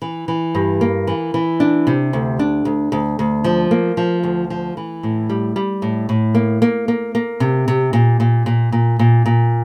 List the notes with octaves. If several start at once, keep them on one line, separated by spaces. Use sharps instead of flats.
E3
E3
G2
A#3
E3
E3
D4
C3
D2
D4
D2
D2
D2
F3
A#3
F3
D2
F3
E3
A2
G3
G3
A2
A2
A#3
A#3
A#3
A#3
C3
C3
A#2
A#2
A#2
A#2
A#2
A#2